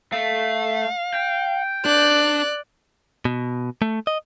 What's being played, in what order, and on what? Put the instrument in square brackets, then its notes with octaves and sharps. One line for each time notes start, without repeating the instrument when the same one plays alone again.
[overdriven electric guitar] A3 [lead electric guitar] F5
[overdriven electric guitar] G5
[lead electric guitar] D4 [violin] D5 F#6
[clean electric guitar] B2
A3
D#5